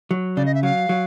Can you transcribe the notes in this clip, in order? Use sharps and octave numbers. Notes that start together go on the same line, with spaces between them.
F#3
C#3 D5
D#5
E5
F#3 F5
F#3